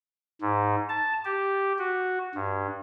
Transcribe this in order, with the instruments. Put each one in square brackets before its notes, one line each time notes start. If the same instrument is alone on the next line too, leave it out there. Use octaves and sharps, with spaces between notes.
[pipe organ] G#2
A5
G4
F#4
G2